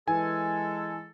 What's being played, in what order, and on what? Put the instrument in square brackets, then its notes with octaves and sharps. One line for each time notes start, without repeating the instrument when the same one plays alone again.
[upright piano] E3 [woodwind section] G#3 A4 [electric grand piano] G#5